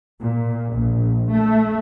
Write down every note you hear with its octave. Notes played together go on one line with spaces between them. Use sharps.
A#2
A#1
A3